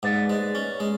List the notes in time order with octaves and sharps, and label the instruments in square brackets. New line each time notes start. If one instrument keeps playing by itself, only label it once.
[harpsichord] G#2 [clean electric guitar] B4 D5
[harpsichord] G#3
C#4
G#3